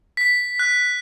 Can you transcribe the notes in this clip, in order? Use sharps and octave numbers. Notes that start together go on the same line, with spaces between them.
B6
F#6